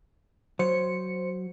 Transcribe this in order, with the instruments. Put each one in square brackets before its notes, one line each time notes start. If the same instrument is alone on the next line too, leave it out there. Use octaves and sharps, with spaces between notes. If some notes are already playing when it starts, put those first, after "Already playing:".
[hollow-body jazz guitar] F#3 [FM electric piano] C5 C#7